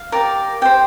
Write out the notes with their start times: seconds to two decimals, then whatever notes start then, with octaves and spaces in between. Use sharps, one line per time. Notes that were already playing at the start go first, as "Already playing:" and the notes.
Already playing: F5
0.12 G4 A#4 D5
0.62 G4 C5 G5